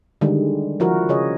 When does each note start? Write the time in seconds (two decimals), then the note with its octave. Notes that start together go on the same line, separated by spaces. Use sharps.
0.21 D3 D#3 G3 G#3
0.80 F3 E4 F#4 A#4
1.09 C#3 G#4 C#5 D#5